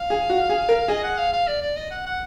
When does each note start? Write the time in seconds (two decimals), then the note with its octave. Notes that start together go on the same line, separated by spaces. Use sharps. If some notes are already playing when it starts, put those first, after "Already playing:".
Already playing: F5
0.10 G#4
0.30 F#4
0.49 G#4
0.69 A#4
0.88 G#4 D#5
1.03 F#5
1.18 F5
1.33 F5
1.47 D5
1.62 D5
1.76 D#5
1.91 F#5
2.06 F#5